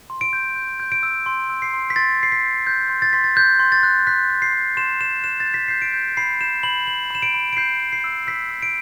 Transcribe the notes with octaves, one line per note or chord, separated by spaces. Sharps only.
C6
D7
G6
G6
G6
D7
E6
C6
E6
C7
C6
B6
C6 A6
C6 C7
B6
G6
F#6 G6
C6
A6
C6 B6
A6
F#6 G6
C6
A6
F#6
F#6 B6
F#6
C7
C6
C6 E7
C6 E7
F#6 E7
A6
G6
B6
G6 C7
D7
G6
B5 C7
G6 E7
B5 F#7
B5 F#7
B5 E7
D7
B5
D7
G6 C7
B5
C7
E6
E6 B6
E6
D7